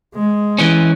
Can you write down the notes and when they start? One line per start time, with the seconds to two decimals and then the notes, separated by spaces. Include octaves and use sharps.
0.15 G#3
0.58 E3 C#4